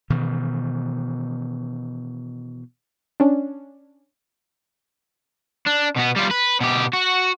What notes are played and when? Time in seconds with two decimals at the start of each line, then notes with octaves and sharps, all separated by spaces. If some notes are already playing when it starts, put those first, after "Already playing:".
0.10 B2 D#3 E3
3.20 C#4 D4
5.67 D4
5.97 B2 B3
6.16 G3 F4
6.31 B4
6.60 B2 G4
6.93 F#4